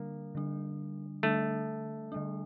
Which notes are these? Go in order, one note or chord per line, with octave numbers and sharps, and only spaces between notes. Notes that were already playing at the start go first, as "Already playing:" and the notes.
Already playing: D3 G3 A#3 D4
D3 G3 D4
D3 G3 A3 D4
D3 G3 D4